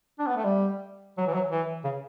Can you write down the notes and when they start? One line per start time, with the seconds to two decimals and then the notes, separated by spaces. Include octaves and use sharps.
0.19 D4
0.27 B3
0.36 A3
0.44 G3
1.17 F#3
1.27 E3
1.34 F#3
1.51 E3
1.84 C#3